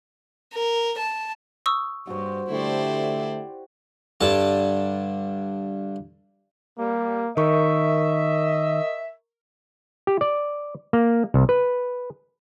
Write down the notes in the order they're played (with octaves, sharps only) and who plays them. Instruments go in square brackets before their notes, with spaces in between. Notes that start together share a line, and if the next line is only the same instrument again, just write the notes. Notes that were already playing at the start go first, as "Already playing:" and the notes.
[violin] A#4
A5
[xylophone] C#6 D#6 E6
[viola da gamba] G2 [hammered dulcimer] F#4 C5
[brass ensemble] D3 A3 [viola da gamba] E4 C5 D5 [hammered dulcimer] F#4 G4
[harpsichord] G2 D3 A5
[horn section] G3 [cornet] A#3
[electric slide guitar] D#3 [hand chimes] A#4 C#6 [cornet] D#5 [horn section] E5
[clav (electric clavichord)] G4
D5
A#3
C2
B4